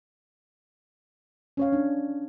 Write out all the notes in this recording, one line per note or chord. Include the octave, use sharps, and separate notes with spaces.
C#4 C#5 F5
D4